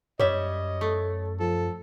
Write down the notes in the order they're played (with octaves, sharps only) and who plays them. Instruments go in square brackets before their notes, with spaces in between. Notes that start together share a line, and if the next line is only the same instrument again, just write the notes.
[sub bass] F#2 [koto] G3 E5 [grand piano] C#5 [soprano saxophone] D#5
[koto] A3
[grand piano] F3 [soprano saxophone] A4